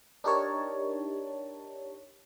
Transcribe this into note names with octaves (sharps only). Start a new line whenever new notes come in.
D4 D#4 G4 A#4 C#5 A5